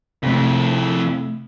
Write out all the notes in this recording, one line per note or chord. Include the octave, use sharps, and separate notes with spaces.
F2 C3 A3 E4